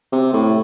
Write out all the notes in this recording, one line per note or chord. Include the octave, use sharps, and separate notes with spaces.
C3
A2